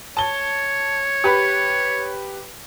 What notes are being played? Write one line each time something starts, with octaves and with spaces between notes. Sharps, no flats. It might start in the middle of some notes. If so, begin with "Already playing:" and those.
C#5 A5 G7
G4 B4 B5